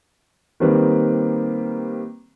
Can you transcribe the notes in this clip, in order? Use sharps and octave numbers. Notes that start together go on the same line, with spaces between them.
D#3 G3 A#3 C4 B4